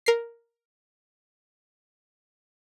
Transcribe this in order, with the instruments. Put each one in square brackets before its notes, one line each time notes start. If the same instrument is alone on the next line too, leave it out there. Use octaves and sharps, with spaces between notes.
[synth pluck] A#4 C7